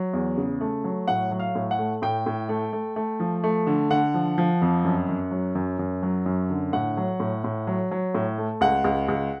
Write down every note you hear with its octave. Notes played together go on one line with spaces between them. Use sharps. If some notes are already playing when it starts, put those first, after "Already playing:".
Already playing: F#3
E2
C#3
A3
F#3
A2 F#5
F#3
F5
A2
F#5
A3
A2 G5
A2
A3
A3
A3
F3
A3
D3
D3 F#5
F3
F3
F2
F#2
F#2
F#3
F#2
F#2
F#3
F#2
D3
A2 F#5
F#3
A2
A2
F#3
F#3
A2
A3
C#2 F#5
C#2
C#2